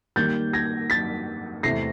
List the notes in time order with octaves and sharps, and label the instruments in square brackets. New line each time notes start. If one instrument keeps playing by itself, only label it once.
[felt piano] D#3 G3 A#3 [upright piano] G6 A6
[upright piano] G#6 A#6
A6 B6
[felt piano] E2 C3 E3 A3 [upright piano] A#6 C7